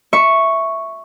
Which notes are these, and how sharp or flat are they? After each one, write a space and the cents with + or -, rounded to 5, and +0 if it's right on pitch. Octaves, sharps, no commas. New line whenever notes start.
E5 +0 C#6 +0